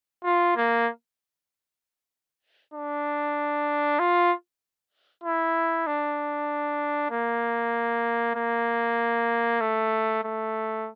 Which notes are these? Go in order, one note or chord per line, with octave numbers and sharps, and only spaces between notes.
F4
A#3
D4
F4
E4
D4
A#3
A#3
A3
A3